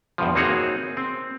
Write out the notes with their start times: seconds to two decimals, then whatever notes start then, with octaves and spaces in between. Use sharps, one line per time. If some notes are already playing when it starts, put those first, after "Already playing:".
0.18 E2 G2 B2 F3
0.35 A#3 C4 D#4 F#4 G#4 C#5
0.97 C4